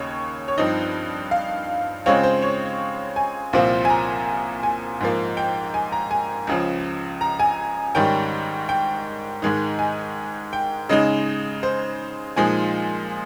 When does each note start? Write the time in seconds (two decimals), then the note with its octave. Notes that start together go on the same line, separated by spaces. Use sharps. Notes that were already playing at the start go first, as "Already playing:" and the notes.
Already playing: D#2 C#3 D#4 C#5
0.48 C#5
0.58 G2 F3 C4 D#4 D#5
1.31 F5
2.06 C#3 G#3 C4 F4 C#5
2.23 C5
2.42 C#5
3.16 G#5
3.53 C2 A#2 F3 C4 F4
3.85 G#5
3.90 A#5
4.63 G#5
5.01 G#2 F3 A#3
5.37 G5
5.74 G#5
5.92 A#5
6.11 G#5
6.47 C#2 C#3 F3
7.21 A#5
7.40 G#5
7.95 G#2 D#3 G3 C#4 G5
8.69 G5
9.42 G#2 D#3 G#3 D#4
9.79 G#5
10.53 G5
10.89 C#3 G#3 D#4 D#5
11.63 C5
12.36 A#2 F3 G#3 D#4 G#5